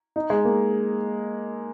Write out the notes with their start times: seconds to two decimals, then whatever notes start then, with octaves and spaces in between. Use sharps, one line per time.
0.16 D#4
0.30 G#3
0.45 A#3